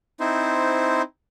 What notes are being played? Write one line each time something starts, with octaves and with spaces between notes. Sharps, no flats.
C4 D#4 E4 C5